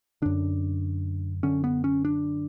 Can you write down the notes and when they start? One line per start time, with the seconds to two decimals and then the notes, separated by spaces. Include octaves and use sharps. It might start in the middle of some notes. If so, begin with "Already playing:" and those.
0.22 F#2 D3 D4
1.43 F#2 D3 C#4
1.64 B3
1.84 C#4
2.05 D4